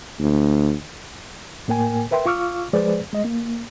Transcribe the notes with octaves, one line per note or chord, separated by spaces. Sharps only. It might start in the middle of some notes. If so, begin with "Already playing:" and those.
D2
A2 A#3 A#4 G5 G#5
A#4 B4 E5 G5 C6
F4 F5 C#6 D6 E6 F6
F3 G#3 G#4 B4 C5 D5
G#3 D#5
A#3